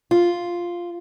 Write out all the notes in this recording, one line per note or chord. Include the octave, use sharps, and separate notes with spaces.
F4